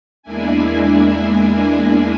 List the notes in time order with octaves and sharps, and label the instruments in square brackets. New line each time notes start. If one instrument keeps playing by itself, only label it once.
[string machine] E2 G#3 A#3 D4 E4 G#5